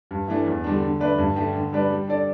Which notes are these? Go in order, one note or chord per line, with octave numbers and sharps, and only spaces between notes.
G2
E3 A3 D4
E2
D3 G3 D4
D3
A3 D4 B4 D5
G2
D3 A3 D4 G4
D3
G3 D4 B4 D5
G3
D4 A4 D5